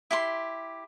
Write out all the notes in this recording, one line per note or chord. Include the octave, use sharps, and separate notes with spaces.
E4 G4 C6